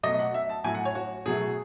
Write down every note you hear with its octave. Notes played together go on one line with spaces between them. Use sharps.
B2 F#3 A3 D#5
F#5
E5
A5
A2 F#3 A3 G#5
F#5
C#5
F#4
B2 F#3 A3 G#4